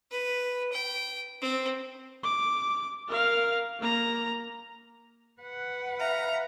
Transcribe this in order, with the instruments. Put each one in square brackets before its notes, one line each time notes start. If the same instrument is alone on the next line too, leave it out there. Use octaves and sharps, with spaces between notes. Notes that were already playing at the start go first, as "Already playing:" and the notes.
[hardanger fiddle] B4
G5
C4
[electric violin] D6
A#4 F5
A#3 A#5
[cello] B4 F#5
[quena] E5 [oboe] F5 [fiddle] A#5